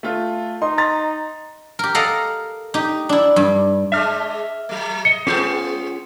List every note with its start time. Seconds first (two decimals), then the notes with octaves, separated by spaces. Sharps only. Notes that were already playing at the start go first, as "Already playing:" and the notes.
0.03 A3 F4
0.62 D#4 C6
0.78 A#5 C6 A6
1.79 G4 A#4
1.95 A4 A#4 D#5 F5 F#5
2.74 D#4 G4
3.09 D4 E4
3.36 G2
3.92 G#3 D4 E5 F6
4.69 F#3 A3
5.05 D#5 C#7
5.27 G#3 B3 C#4 F4 G#4